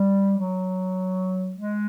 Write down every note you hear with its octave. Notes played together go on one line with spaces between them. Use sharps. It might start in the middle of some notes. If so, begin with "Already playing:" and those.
Already playing: G3
F#3
G#3